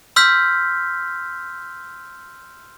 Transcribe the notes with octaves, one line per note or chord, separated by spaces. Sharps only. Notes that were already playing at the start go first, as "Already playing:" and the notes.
C6 E6 F6 G6 B6